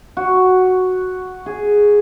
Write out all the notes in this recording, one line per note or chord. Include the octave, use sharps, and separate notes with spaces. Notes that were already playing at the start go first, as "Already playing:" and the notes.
F#4
G#4